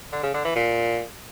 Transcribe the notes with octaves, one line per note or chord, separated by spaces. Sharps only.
D3
C#3
D3
E3
A#2